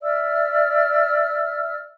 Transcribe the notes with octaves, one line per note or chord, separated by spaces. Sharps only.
D5 E5 E6 F6